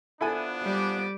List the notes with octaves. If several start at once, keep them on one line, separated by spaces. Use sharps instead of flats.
F3 B3 D4 E4 A4 G#5
G3 D5